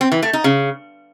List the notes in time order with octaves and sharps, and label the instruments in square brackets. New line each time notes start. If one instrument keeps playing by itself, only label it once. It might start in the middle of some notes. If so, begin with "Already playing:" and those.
[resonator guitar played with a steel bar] C4
E3
A3
D#4
C#3